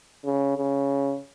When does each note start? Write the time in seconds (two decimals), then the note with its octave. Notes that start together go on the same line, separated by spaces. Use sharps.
0.25 C#3
0.57 C#3